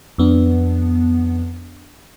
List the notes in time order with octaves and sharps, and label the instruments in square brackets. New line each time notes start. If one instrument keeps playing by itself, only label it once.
[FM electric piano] F2 B3 D4